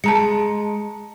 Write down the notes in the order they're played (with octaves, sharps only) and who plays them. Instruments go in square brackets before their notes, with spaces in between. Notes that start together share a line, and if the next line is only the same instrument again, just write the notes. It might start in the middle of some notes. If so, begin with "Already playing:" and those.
[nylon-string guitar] G#3 [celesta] A5 A#5 C#7